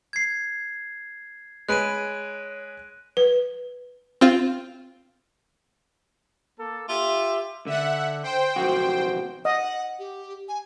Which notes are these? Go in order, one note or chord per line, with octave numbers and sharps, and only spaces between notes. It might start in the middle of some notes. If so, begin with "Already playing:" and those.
G#6 C7
G#3 B4 C#5 F#6 D7 D#7
B4
C4 F4
A#3 A4
F4 G4 E5
D3 E5 F#5
C5 G5
B1 F2 F#4
D#5 F#5
G4
G#5